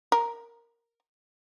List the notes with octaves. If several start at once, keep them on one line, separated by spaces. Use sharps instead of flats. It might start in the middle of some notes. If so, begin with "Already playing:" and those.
A#4